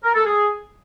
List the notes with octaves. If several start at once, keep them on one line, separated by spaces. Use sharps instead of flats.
A#4
A4
G#4